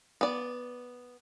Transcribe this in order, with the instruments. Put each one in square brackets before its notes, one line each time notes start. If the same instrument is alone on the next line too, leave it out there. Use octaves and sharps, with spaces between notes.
[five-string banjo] B3 D5